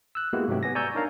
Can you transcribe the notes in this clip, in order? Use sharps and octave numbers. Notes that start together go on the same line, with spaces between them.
E6 F#6
G#3 A#3 B3 E4 F#4 G4
G#2 C3 F#3 A3 G4
B3 G#5 A#6
D5 G#5 A#5 C#6 E6 G6
D4 D#4 A#4 C#5 F5 A#5